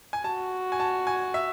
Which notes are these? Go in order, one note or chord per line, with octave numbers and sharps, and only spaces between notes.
G#5
F#4 A5
G#5
A5
G#5
E5